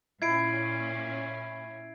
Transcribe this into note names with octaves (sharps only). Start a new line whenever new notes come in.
A#2 C#4 E4 G#6 C7 D7